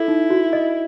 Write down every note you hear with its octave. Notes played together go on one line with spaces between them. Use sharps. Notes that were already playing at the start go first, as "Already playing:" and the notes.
Already playing: E4 A4
D#4
F#4
D#5